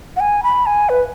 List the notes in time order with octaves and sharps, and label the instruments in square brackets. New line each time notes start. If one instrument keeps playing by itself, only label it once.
[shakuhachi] F#5
G#5
B5
G#5
B4